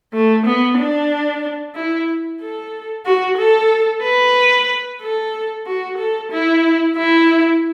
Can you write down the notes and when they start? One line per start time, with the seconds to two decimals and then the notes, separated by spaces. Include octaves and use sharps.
0.13 A3
0.46 B3
0.78 D4
1.75 E4
2.41 A4
3.06 F#4
3.38 A4
4.04 B4
5.01 A4
5.66 F#4
5.98 A4
6.32 E4
6.96 E4